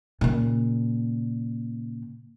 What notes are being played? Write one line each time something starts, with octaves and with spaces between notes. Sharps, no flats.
A#2 C#3